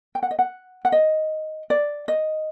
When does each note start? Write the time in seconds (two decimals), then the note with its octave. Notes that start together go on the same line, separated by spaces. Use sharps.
0.15 G5
0.23 F#5
0.31 D#5
0.39 F#5
0.85 F#5
0.92 D#5
1.70 D5
2.08 D#5